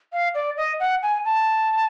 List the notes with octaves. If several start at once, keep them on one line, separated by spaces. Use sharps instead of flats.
F5
D5
D#5
F#5
G#5
A5